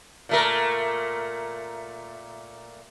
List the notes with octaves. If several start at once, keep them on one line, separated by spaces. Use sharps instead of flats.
A#2 A3 A#4